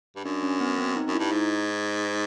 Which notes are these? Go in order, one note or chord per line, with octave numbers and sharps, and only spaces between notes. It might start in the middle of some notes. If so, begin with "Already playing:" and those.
G2
F#2 D4
C#4
B3
C4
D#4
F#2
G2 E4
G#2 D#4